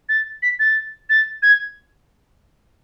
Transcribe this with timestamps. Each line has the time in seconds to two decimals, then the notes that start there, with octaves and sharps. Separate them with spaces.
0.09 A6
0.42 B6
0.59 A6
1.09 A6
1.42 G#6